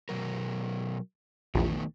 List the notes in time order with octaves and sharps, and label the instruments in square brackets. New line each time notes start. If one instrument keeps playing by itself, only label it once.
[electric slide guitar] B2 F#3 A#4
[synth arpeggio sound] A#1 E2 [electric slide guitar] D#3 A3 B3